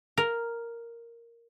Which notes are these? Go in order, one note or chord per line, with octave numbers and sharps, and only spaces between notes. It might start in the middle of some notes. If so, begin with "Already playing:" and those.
A#4